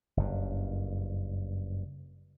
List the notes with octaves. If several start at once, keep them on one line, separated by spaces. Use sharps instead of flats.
F#1 G2